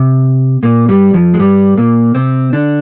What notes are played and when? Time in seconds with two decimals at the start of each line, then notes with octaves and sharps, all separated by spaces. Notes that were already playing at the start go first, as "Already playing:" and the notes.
Already playing: C3
0.63 A#2 A#3
0.88 G2 G3
1.14 F2 F3
1.34 G#3
1.39 G2 G3
1.78 A#2 A#3
2.15 C3 C4
2.53 D3 D4